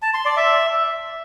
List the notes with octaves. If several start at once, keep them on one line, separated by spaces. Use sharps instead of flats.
A5
C6
D5
E5